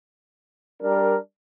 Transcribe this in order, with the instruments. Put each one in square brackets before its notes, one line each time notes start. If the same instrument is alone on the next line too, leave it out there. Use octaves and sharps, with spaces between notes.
[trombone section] G3 D4 A#4